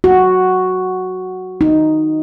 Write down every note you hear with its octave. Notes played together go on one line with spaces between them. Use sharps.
F#4
D#4